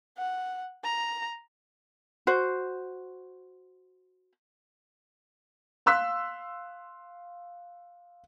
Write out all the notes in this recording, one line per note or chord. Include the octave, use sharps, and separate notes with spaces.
F#5
A#5
F#4 C5
F5 C6 E6 F#6 B6